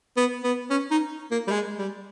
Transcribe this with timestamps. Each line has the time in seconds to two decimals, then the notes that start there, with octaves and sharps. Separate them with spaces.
0.17 B3
0.44 B3
0.70 C#4
0.91 D#4
1.31 A#3
1.47 G3
1.51 G#3
1.79 G3